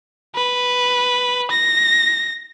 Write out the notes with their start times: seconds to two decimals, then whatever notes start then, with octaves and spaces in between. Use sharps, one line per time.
0.36 B4
1.51 A#6